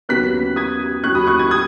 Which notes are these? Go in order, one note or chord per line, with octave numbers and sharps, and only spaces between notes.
D#2 C#3 F#3 B3 F#6 B6
D#6 G#6
D#2 C#3 F#3 C#6 F#6
B5 D#6
C#6 F#6
D#6 G#6
D#6 G#6